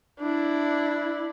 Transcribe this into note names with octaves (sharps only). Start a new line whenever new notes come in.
D4 E4